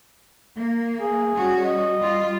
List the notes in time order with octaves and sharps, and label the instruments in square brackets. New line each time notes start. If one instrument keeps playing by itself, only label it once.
[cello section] A#3
[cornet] G#4
[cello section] G3 C#4 F#4
[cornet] D#5
[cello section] G3 F4